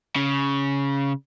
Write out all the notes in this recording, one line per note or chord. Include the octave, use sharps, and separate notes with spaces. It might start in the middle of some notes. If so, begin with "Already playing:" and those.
C#3